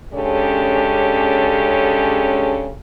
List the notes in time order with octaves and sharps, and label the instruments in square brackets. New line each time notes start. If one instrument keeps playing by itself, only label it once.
[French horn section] C#3 G#3 C#4 D4 G4 A4